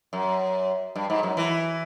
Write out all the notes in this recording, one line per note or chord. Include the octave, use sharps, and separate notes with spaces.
F#2
G2
G#2
F#2
E3